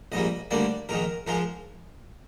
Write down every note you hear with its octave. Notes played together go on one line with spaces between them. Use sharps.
A#1 G#2 G3 A#3 D#5
D2 D3 G3 A#3 D5
A#1 G#2 D#3 A#4
G#2 F3 G#3 A#4